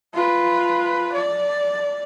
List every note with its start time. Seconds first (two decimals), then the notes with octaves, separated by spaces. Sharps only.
0.14 F4 B4
1.13 D5